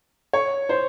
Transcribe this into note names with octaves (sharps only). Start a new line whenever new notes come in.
C#5
C5